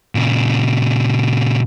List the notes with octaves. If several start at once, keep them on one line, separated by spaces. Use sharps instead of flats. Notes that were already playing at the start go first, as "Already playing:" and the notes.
A#2 C#3